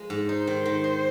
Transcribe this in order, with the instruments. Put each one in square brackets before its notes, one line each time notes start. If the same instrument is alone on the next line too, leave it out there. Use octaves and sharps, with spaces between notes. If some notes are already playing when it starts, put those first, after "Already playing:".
Already playing: [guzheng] F3 G#3
G#2
[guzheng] D#4 [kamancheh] C5
[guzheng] D#3
D#3
D#4